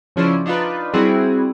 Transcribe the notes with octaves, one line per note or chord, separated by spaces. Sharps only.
C#3 F3 C#4 D4 E4 C5
D4 D#4 F4 B4
G3 C4 E4 F#4 G#4